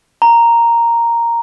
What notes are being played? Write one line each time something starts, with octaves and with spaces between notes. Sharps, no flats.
A#5